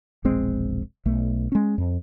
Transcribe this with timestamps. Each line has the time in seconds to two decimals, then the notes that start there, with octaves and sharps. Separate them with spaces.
0.24 E1 A#1 G#3 C4
1.06 B1 A3
1.52 G#3 C#4
1.78 F2